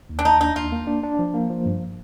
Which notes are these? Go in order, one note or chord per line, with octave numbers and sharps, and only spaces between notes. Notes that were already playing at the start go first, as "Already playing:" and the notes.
D#2
D4
D#2 D#4
D4 D#4
D#2 F4
A#3
D4
D4
F3
A#3
F3
G2